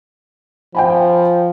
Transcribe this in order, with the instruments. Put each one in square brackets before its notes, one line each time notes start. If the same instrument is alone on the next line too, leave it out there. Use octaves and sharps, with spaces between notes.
[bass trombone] F3 [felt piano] G5 G#5 B5